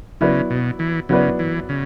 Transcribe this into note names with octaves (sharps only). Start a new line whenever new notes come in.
C#3 F#3 B3 E4 B4 D5
B2
E3
C#3 F#3 B3 E4 B4 D5
E3
C#3